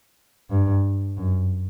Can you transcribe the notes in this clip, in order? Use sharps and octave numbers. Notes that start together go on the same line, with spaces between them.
G2
F#2